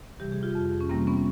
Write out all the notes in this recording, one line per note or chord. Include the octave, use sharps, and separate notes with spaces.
C3 E3 G3 G4
G#4
F4 G4
F2
C#4
C3 E3 G3 A#3 C4
B3 C#4